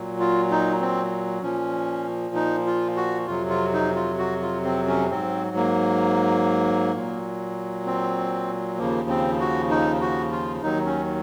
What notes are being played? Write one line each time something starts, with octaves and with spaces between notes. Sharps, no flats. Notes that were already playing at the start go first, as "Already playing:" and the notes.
Already playing: A#2 F#3
F4
D#4
C4
A#2 F3 C#4
D#4
F4
F#4
F2 C3 F#3 F4
F4
D#4
F4
F#4
F4
C4
C#4
G#2 F#3 C4
A#3
A#2 F#3
C4
D#2 C#3 F3 A#3
C4
F#4
D#4
F#4
F4
D#2 D#3 F#3 D#4
C#4